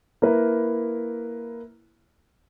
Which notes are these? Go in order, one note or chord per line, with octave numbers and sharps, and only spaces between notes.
A#3 E4 A#4 B4